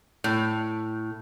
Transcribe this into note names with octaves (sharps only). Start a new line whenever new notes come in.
A2